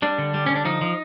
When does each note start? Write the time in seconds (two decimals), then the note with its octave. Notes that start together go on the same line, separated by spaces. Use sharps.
0.02 G3 D4
0.18 D3
0.34 G3
0.46 D3 C#4
0.56 D4
0.65 F3 D#4
0.81 F3